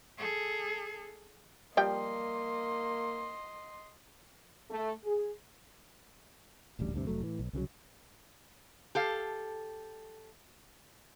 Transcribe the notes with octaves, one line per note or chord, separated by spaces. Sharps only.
G#4 A4
F3 G3 A#3 D#5 G5 C6
A3
G#4
D#1 A1 D2 G3
D2 G2 C3
F1 F#3 A3
A2 E3
B1
C2 C#3 E3 F#3
G4 A4 F5